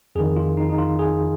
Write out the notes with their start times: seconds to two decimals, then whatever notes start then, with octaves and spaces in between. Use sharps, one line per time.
0.15 F2 D#3 G#4
0.36 F4
0.57 D#4
0.70 D#4
0.78 F4
0.99 G#4